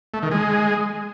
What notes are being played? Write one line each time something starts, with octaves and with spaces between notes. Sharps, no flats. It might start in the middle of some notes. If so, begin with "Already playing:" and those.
A3
D#3
G#3